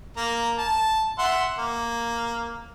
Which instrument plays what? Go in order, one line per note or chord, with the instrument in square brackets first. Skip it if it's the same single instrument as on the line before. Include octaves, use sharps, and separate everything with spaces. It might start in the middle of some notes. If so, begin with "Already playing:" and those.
[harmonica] A#3 A#5
A5
E5 F#5 C6
A#3